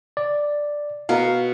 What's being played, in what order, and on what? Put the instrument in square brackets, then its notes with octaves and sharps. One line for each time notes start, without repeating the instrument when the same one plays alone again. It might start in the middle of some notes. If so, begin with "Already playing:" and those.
[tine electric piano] D5
[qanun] B2 A#4 [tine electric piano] F5